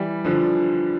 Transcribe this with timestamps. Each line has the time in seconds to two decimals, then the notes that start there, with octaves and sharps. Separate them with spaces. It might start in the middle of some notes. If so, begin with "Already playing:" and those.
Already playing: E3 G3
0.25 D3 F3